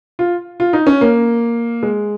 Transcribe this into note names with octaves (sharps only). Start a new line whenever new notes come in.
F4
F4
D#4
C#4
A#3
G#3